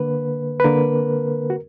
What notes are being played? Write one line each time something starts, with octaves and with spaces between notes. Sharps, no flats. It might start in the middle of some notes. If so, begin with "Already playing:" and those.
Already playing: D3 A#3 B4
B4
D3 A#3 A#4
F#4